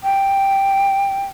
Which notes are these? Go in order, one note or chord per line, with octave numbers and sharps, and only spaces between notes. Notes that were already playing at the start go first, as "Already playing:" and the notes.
G5